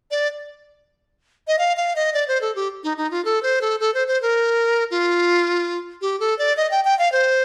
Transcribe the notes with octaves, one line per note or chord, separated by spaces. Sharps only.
D5
D#5
F5
F5
D#5
D5
C5
A4
G4
D#4
D#4
F4
A4
C5
A4
A4
C5
C5
A#4
F4
G4
A4
D5
D#5
G5
G5
F5
C5